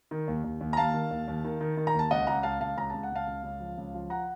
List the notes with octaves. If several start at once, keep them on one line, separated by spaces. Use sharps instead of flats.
D#3
D#2
D#2
D#2
A#5
D#2 F5 A5
D#3
D#2
D#2
D#3
D#3
D#3
A#5
D#2 A5
C#2 D#5 F#5
C#2 F#5 A#5
C#2 F5 A5
C#2 F5 A5
C#2 A#5
C#2 A5
F#5
C#2 F5 A5
C#2
C#2
F3
C#2
F3
F#5 A#5